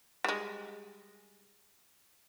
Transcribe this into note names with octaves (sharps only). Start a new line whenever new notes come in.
G3 G#3